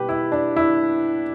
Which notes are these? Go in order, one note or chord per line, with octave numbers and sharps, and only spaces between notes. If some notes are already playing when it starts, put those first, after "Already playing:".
Already playing: B2 G3 G4 B4
E4
D4
E4